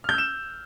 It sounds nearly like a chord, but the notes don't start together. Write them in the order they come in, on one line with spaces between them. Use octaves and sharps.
F6 G6 E6 E7